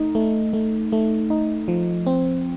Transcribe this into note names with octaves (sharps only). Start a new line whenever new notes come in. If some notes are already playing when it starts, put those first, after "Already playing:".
Already playing: A3 D#4
A3
A3
A3
D#4
F3
C4